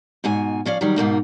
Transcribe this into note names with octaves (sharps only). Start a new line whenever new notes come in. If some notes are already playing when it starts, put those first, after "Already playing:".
G#2 B2 G#5
F3 C#4 D5 F5
D#3 F#3 G3
G#2 B2 A#3 D#4